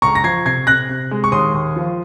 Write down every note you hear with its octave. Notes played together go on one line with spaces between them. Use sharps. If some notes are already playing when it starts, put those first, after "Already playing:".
C#2 A#5 C#6
A#6
F3 G#6 C7
C3 G#6 C7
C3 F#6 A#6
C3
G#3
C#6
D#2 C6 D#6
D#2
F3